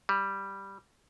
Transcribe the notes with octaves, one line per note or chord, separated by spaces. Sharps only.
G3